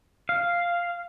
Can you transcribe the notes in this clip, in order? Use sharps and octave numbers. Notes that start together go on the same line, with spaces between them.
F5